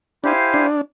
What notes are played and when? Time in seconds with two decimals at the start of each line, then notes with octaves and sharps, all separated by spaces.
0.24 D4 E4 G4 C5 F5 G#5
0.54 D4